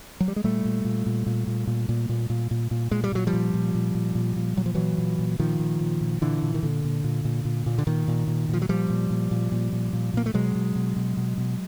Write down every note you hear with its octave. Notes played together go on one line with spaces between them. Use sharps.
F#3
G3
G#3
A#2 G3 A3
A#2
A#2
A#2
A#2
A#2
A#2
A#2
A#2
A#2
A#2
A#2
A#2 G#3
G3
A#2 F#3
F3 G3
A#2
A#2
A#2
A#2
A#2
A#2
A#2 F#3
F3
A#2 E3 F#3
A#2
A#2
A#2 D#3 F3
A#2
A#2
A#2
A#2 D3 E3
A#2
D#3
A#2 D3
A#2
A#2
A#2
A#2
A#2
D3
A#2 D#3
A#2
A#2
A#2 F3
F#3
A#2 F3 G3
A#2
A#2
A#2
A#2
A#2
A#2
A#2 A#3
A3
B2 F#3 G#3
B2
B2
B2
B2
B2